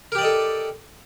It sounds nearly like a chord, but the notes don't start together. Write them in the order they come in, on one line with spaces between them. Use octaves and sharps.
A#4 G4 D5 D#5 A4